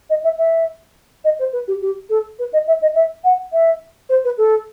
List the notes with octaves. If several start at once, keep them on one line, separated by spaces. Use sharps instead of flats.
D#5
E5
E5
D#5
C5
B4
G4
G4
A4
B4
D#5
E5
D#5
E5
F#5
E5
C5
B4
A4